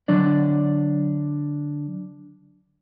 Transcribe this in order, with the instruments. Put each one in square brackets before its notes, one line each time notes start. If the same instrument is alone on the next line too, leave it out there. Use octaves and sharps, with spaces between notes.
[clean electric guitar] D3 F#3 D4 D5